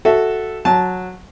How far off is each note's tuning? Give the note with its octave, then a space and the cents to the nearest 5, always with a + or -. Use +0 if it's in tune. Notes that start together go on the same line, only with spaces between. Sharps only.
F#4 +0 A4 +0 E5 +0
F#3 -15 A5 -15